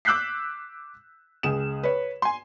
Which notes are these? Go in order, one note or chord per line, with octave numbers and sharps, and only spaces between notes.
D6 E6 F#6 G6 B6 C7
C#2 G#4 E7
B4 C#5
G#5 C6